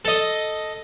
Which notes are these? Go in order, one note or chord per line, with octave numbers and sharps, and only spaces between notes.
A4 D#5